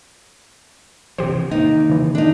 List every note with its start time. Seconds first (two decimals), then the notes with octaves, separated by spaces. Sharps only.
1.18 C3 E3 F3 G4 C5
1.51 D#3 A#3 D#4
1.90 C#3 E3
2.15 D4 D#4